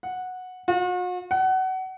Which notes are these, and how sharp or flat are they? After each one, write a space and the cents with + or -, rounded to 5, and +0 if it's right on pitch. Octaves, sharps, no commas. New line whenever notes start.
F#5 -10
F#4 -45
F#5 +25